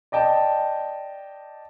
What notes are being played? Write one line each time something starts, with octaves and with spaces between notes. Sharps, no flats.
D5 D#5 G5 A5